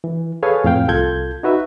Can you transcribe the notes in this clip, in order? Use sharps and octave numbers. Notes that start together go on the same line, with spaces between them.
E3
G#4 A4 B4 C#5 F5 G#5
F2 A2 F5 G5
C2 F4 A4 G6 G#6
D#4 F#4 B4 E5